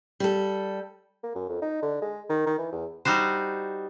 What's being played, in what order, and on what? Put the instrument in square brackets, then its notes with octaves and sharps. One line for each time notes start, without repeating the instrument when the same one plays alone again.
[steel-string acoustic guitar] G3 A4
[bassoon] A#3
F#2
F2
D#4
D3
G#3
D#3
D#3
E3
E2
[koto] G3 D#4 F#4 C5